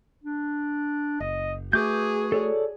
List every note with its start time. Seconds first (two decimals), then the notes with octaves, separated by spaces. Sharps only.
0.24 D4
1.20 F#1 D#5
1.73 A3 F#4 G#4 B4 D6 G6
2.32 A4 C#5 D5